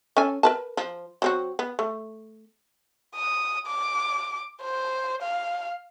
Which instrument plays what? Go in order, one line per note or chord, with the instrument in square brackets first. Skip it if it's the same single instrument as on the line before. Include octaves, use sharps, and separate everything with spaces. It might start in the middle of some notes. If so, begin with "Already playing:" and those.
[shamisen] C#4 A4 G#5
A#4 B4 A5
F3
F#3 C4 F#4
B3
A3
[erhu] D#6
D6
C5
F5